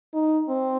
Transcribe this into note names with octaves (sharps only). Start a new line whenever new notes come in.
D#4
C4